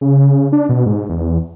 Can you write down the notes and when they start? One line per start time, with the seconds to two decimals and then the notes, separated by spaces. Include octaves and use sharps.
0.01 C#3
0.52 D4
0.69 B2
0.86 G#2
1.09 E2